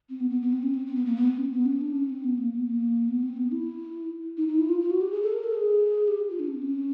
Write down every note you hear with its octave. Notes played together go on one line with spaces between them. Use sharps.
C4
B3
B3
B3
C4
C#4
C4
C4
B3
A#3
B3
C4
C#4
B3
C#4
D4
C#4
C4
B3
A#3
B3
A#3
B3
C4
B3
E4
D#4
D#4
E4
F4
F4
F#4
G4
G#4
A4
A#4
A4
G#4
G4
F4
D4
C#4
C4
C#4